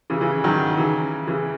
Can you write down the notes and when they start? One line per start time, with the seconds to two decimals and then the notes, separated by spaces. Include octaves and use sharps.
0.10 C#3 E3
0.21 C#3 E3
0.44 D#3 F#3
0.77 C#3 E3
1.27 C#3 E3